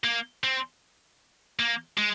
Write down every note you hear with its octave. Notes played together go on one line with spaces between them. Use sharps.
A#3
C4
A#3
G#3